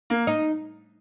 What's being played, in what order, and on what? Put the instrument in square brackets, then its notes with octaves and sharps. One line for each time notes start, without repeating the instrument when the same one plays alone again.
[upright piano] A#3
[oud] D#4